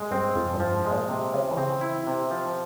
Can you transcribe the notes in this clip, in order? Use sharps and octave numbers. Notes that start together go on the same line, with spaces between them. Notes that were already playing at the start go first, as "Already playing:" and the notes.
Already playing: A#2 G#3
G2 C4
F2 F3
G2
F3
G#2
G#3
A#2
C3
C#3 F3
E3
C#3 C4
E4
C3
F3